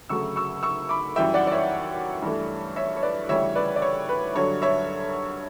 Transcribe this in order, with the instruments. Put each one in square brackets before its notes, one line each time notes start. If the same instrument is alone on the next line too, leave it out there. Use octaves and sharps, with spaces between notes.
[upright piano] D2 C#3 F#3 A3 C#6 E6
C#6 E6
C#6 E6
B5 D6
F#2 E3 G3 E5 G5
D5 F#5
D5
C#5 E5
G2 E3 A3
C#5 E5
C#5
B4 D5
D2 C#3 E3 G3 C#5 E5
B4 D5
D5
C#5
B4
G2 D3 F#3 C#5
C#5 E5